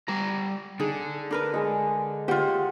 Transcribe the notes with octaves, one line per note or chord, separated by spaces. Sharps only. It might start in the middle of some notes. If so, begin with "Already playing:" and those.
G3 A#5 D6
D3 D#4 G#4
D4 A#4 B4
G#3 D#5
F4 G4 C#5 F#5